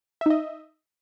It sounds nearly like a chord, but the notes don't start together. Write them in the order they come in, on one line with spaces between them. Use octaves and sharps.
E5 D#4 D#5